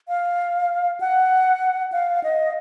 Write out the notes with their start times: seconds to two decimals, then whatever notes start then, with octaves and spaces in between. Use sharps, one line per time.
0.08 F5
1.01 F#5
1.92 F5
2.24 D#5